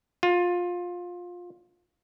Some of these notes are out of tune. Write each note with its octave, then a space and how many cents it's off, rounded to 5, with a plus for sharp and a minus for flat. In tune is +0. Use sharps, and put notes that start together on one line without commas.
F4 +20